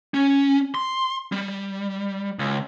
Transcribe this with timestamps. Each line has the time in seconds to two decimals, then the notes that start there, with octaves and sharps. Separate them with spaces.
0.14 C#4
0.75 C6
1.32 G3
2.39 C#2